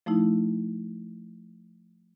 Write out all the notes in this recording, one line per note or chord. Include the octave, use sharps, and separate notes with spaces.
F3 A3 D#4 E4